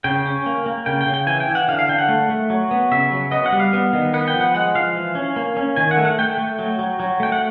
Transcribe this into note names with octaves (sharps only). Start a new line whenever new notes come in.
C#3 G5
C#4
A#3
A#3
C#3 G5
G5
C#3
G5
E3 G#5
G5
E3
F#5
D3 F5
F5
D3 G5
F#5
A3
A3
F#3
B3
C#3 E5
F#3
B3 D#5
F#5
G3
F5
B3
D#3
B3 F#5
G5
F3
F#5
G#3 F#5
F3 F5
E3
C#4
A#3
C#4
D#3 G#5
F#5
A3
F#5
A3 G5
A3
F#3
F#3
F#3
A3 G5
F#5